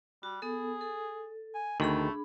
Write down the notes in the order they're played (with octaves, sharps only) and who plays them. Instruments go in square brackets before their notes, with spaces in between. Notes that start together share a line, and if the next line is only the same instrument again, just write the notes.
[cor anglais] G3 [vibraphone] F#4
[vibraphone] B3 A4 [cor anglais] G#4
[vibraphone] A4
[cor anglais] G#5
[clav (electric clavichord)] D2 D#3 [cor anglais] A3 [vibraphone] D4 G#4 B5